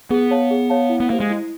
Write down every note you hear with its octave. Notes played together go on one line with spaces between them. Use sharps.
B3 G#4
C#5 F5 A5
G#4
C#5 F5 A5
E4
B3
A#3 G4 C5 F5
G#3
E4